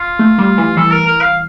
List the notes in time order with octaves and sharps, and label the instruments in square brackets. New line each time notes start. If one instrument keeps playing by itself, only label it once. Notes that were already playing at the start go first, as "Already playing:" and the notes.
Already playing: [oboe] F4
[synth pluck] A3
G3
E3
[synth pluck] E3 [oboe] A4
[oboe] A#4
A#4
F5